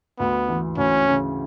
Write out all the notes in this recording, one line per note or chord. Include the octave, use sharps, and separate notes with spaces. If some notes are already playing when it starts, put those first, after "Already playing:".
D2 B3
E3
D2 C#4
C#3